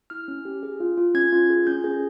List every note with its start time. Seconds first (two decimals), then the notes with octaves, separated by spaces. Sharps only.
0.10 E4 F6
0.28 C#4
0.45 G4
0.63 G#4
0.80 F4
0.98 F4
1.14 C#4 G#6
1.33 F4
1.50 G#4
1.67 C#4 G6
1.84 G#4